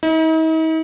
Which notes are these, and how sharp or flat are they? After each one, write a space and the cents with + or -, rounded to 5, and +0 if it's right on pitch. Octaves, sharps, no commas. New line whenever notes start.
D#4 +45